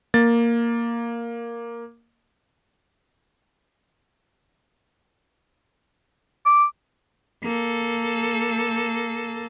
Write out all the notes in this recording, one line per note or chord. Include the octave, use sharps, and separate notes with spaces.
A#3 A6
D6
A#3 A4